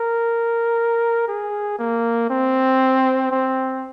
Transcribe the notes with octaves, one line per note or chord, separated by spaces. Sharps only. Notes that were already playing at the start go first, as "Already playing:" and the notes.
Already playing: A#4
G#4
A#3
C4
C4